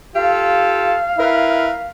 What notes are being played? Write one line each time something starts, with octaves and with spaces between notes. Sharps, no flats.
F4 G4 A4 F5
E4 A#4 B4